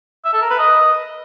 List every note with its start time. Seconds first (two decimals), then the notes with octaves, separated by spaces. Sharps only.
0.25 E5
0.33 A4
0.42 A#4
0.50 B4
0.59 D#5